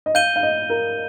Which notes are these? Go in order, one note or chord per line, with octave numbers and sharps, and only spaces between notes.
D#5
F5 G6 D#7 G7
F5
D#5
A#4